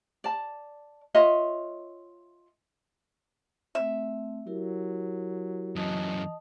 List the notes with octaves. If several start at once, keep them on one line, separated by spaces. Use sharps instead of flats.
D5 A5
F4 C#5 D#5 E5
A3 C4 E5
F#3 E4 G4 A#4
F#2 E3 D#5 A5 D#6